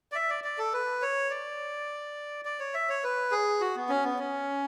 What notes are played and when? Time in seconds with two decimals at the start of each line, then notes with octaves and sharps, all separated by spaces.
0.12 D5
0.15 E5
0.30 D5
0.44 D5
0.58 A4
0.73 B4
1.02 C#5
1.30 D5
2.45 D5
2.60 C#5
2.74 E5
2.89 C#5
3.04 B4
3.32 G#4
3.61 F#4
3.76 B3
3.89 C#4
4.04 B3
4.19 C#4